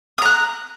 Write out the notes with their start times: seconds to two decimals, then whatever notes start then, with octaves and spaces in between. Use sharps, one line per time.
0.18 D#6
0.22 A#5
0.26 F#6